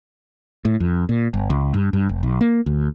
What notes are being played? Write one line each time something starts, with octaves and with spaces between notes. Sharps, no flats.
A2
F2
A#2
G1
C#2
G2
G2
F1
B1
A#3
D2